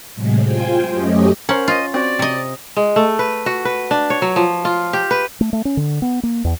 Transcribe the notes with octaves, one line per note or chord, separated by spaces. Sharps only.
A2 C3 F#3 G#3
F4 C5 G5 G#5
F#2 A3 C#4 G4 D#5
C#4 A#4 C5 F#5
F4 D#5
C4 F#4 D5
C3 D#5
G#3
A3
B4
F#4
B4
D4
C#5
F#3
F3
F4
G4
B4
A3
A3
C#4
D3
B3
A#3
E2